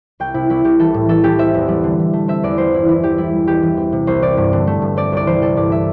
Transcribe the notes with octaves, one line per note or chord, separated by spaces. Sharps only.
C2 G5
C3 E4
C2 E4
C2 G4
E3 A4
A2
E3 A4
E3 G4
C4 E5
E2
G3
D3
E3
A3
C4 E5
E2 D5
E3 C5
G1 E4
E3 E4
E3 G4
G3 E4
G3
E1 G4
E3
C4
C3
C2 C5
C3 D5
G2
D3
A3
G2
C4 D5
C2 D5
E3 C5
C3 A4
G2 D5
E5